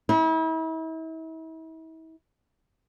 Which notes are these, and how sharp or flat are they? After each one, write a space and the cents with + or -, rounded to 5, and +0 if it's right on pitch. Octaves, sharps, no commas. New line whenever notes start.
E4 -40